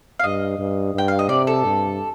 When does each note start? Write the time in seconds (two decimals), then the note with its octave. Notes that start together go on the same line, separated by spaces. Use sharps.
0.20 F5
0.24 G2 D#5
0.59 G2
0.94 G2 G5
1.08 F5
1.19 D#5
1.29 C3 D5
1.47 A4
1.64 G2